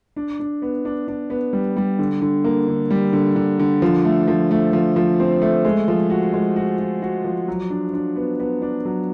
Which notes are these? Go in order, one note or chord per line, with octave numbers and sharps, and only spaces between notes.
D4
D4
B3
D4
D4
B3
G3
G3
D3
D3
A#3
D3
G3
D3
D3
D3
F3
A3
F3
A3
F3
F3
C4
A3
G#3
F3
F#4
G#3
F#4
F#4
F#4
F3
F#3
D4
D4
B3
B3
D4
F#3